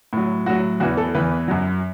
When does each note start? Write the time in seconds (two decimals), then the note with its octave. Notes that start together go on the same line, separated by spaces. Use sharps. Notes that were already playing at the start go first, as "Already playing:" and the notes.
0.13 A2 F#3
0.46 A2 F#3 F#4
0.80 E2 E3 F#4
0.97 A4
1.15 E2 E3 B4
1.48 F#2 F#3